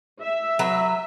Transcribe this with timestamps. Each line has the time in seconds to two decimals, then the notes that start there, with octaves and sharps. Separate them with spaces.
0.21 E5
0.59 F#3 B4